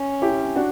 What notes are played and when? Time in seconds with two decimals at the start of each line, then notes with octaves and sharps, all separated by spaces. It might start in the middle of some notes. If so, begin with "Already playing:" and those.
Already playing: C#4
0.22 E4 G4
0.56 D4 F#4